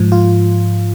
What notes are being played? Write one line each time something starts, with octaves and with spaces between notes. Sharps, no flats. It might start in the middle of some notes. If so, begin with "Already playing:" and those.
Already playing: G#2 F3
F4